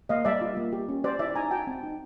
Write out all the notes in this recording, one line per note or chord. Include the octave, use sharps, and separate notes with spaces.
A#3 D#5 F5
G3 D5 E5
F4
A#3
G4
C#4
G4 C5 D5
E4 D5 E5
D#4 G#5 A#5
F#4 G5 A5
C4
D#4